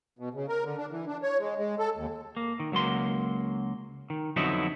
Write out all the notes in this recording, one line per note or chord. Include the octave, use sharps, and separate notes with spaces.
B2
C#3
A#4
D3
D4
E3
D4
C#5
G#3
G#3
A4
D#2
A#3
D#3
C#2 F#3 A#3 C6
D#3
F2 D3 F#3 B3 D#4 E4